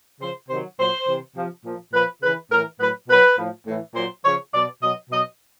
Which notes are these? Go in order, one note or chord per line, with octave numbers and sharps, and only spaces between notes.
C#3 F3 C5
C3 D#3 F#3 C5
A#2 F#3 C5
C3 E3
C3 F3
A#2 F3
A#2 F3 B4
C#3 E3 B4
A2 E3 A#4
A2 F#3 B4
B2 F#3 B4
A2 F3
A2 E3
A#2 F#3 C5
C#3 F3 C#5
B2 F#3 D5
B2 F#3 D#5
B2 F#3 D#5